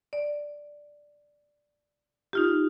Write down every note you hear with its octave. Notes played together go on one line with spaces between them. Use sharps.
D5
D#4 F4 G4